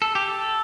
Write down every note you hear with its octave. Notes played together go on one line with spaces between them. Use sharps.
A4
G4
A4